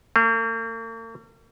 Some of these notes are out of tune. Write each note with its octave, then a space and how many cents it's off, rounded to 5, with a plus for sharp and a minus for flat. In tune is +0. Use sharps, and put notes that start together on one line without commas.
A#3 -45